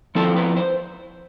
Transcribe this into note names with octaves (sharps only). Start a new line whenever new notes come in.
F3 C4 E4 A4
B4
C5